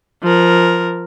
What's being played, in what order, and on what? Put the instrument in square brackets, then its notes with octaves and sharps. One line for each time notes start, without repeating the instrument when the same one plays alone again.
[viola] F3 A#4